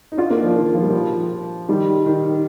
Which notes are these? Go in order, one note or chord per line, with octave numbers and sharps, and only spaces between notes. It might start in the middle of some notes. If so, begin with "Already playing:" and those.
D#4
D4 F4
A#3 D4
F3
D#3
F3
G3
F3
D#3 G3
D#3